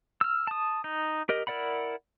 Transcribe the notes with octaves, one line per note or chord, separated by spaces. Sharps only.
E6 F6
A5 D#6
D#4
G4 A#4 D#5
E4 A#4 D5 F#5 B5